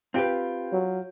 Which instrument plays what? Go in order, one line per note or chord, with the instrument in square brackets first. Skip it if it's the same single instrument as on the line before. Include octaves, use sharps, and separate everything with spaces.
[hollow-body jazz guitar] C4 G4 B4 [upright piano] F4 G6 D7
[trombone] F#3